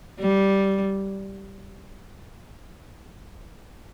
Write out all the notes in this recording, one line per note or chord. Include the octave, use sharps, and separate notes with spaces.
G3